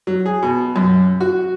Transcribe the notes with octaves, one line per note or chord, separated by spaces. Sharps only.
F#3
G#4
B2
F#2
F#4